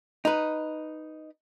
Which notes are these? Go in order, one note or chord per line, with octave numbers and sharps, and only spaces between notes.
D#4 B4